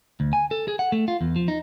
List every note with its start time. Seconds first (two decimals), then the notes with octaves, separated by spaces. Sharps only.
0.20 D2
0.33 G#5
0.51 A4
0.68 G#4
0.79 F#5
0.92 A3
1.08 F4
1.21 E2
1.36 F3
1.48 D#4